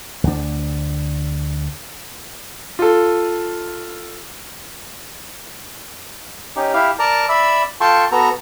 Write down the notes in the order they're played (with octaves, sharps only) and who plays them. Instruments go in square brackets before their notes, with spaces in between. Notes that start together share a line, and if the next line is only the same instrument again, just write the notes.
[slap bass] D2 D4
[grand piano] F4 A4
[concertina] C#4 D#4 G4
E4 G4 F5
A#4 D5 A5 A#5
D5 E5 B5 E6
F4 A4 G5 A5 C6 C#6
B3 F#4 A4 A#5